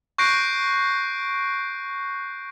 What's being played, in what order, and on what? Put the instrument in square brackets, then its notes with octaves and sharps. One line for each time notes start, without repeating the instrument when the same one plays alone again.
[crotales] C#6 F#6 G6 A#6 C7 D7